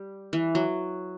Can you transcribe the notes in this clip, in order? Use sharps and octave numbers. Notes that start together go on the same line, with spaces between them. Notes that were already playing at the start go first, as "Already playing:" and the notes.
Already playing: G3
E3
F#3